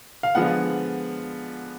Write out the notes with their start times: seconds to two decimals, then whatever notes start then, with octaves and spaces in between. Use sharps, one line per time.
0.23 F5
0.35 D3 F3 G#3 B3 F#5